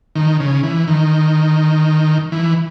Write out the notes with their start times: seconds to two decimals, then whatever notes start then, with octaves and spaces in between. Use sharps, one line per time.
0.15 D#3
0.40 C#3
0.63 E3
0.88 D#3
2.32 E3